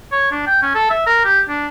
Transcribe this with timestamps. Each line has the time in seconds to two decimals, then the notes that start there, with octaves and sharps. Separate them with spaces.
0.12 C#5
0.32 D4
0.47 G5
0.63 C#4
0.75 A4
0.91 E5
1.07 A#4
1.25 G4
1.49 D4